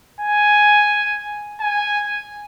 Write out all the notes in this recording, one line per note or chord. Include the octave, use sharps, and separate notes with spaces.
G#5
G#5